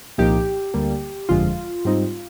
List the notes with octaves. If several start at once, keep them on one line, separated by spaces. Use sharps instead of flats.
C2 A#2 F3 A#3 D#4 G4
D2 D3 G3 A#3
G1 F2 D3 F3 G#3 F4
G#2 G3 C4 D#4